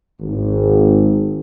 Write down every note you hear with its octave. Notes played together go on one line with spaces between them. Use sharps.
G#1